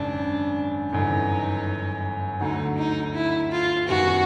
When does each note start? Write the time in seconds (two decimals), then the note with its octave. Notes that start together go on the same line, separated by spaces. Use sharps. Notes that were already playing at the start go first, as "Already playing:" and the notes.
Already playing: G#1 F#2 C#3 D4
0.93 G1 F#2 C#3 E3 D#4
2.41 D2 D3 F#3 D#4
2.78 D#4
3.15 E4
3.51 F4
3.88 F#1 F#2 D#3 G3 B3 F#4